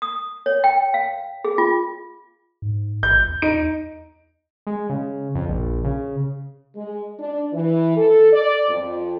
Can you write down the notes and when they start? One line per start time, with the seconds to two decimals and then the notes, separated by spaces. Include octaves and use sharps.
0.02 D#6
0.46 C#5
0.64 G5
0.94 F5
1.44 G#4
1.58 F4
2.62 G#2
3.03 A1 G6
3.28 E2
3.42 D#4 D7
4.67 G#3
4.90 C#3
5.35 F2
5.49 A#1
5.84 C#3
6.76 G#3
7.19 D4
7.53 E3
7.97 A4
8.32 D5
8.69 F2